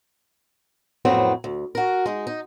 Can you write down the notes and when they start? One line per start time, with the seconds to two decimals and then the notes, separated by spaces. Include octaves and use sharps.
1.05 F2 A2 F#3 B3 C4
1.44 D2
1.75 F#4 A#4
2.06 G#3 D#4
2.27 D#4